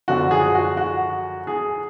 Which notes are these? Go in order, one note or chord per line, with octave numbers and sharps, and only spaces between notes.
F#2 D3 F3 F#4
G#4
F#4
F#4
G#4